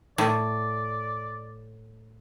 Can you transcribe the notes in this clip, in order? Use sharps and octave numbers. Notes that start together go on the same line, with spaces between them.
A2 D5